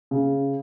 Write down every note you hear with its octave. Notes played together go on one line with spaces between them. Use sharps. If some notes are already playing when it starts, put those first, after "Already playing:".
C#3